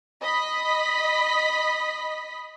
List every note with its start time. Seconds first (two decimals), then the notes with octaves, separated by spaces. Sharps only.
0.21 D#5 B5 B6